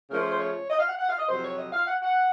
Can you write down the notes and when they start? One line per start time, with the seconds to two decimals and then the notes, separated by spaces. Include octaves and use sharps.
0.11 C#3 F3 A3 C#4 A#4
0.21 C5
0.31 C5
0.41 C#5
0.70 D#5
0.79 F5
0.89 F#5
0.99 F#5
1.09 F5
1.19 D#5
1.28 F2 C3 F#3 C5
1.43 C#5
1.58 D#5
1.73 F5
1.87 F#5
2.02 F#5